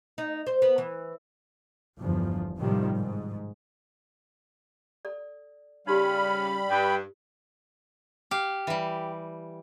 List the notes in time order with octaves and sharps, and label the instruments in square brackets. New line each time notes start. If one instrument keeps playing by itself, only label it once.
[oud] D#4
C5
B3
E3
[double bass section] G1 E2 F3
A2 C3 D#3 F3 G3
G#2
[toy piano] A4 D5
[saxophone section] C#3 C#4 F5 [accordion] G3 B5 [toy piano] D#4 G4 A4
[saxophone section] G2 [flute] G5
[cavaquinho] G4 [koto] F5
[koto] E3 G3